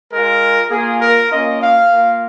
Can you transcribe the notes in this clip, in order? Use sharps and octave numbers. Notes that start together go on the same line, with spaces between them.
G#3 F4 A#4
A#3 F4 G#4
A#4
A#3 C#4 F4 D#5
F5
A#3 F4